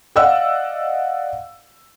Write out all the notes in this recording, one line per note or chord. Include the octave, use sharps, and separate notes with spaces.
D5 D#5 F5 F#5 E6